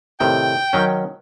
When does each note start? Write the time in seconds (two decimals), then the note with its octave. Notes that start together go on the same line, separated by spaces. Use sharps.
0.20 A2 C3 D#3 G5
0.73 D#3 F#3 C#4